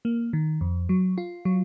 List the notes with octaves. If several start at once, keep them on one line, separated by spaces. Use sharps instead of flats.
A#3
D#3
F2
F#3
F4
F#3